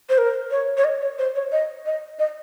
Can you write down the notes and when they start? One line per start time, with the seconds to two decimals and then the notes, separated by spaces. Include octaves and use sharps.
0.09 C5
0.18 A#4
0.51 C#5
0.77 C#5
0.84 D#5
1.01 C#5
1.19 C5
1.35 C#5
1.52 D#5
1.86 D#5
2.19 D#5